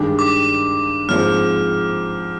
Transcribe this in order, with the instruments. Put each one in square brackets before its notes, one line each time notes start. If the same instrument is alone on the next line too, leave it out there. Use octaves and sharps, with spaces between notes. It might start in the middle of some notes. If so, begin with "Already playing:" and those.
Already playing: [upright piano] G2 D#3 G#3 D4 G4
[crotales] D6
[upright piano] G#2 F3 C4 [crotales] F6